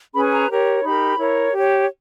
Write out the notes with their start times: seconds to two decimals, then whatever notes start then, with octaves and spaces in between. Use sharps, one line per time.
0.14 C#4 G#4 B4 B5
0.32 A#5
0.49 G4 A#4 C#5
0.83 D#4 G4 A#4 B5
1.17 E4 A#4 C#5
1.52 G4 C#5